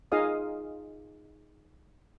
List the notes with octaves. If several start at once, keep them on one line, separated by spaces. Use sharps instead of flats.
D#4 F4 G#4 D#5 F5 D#6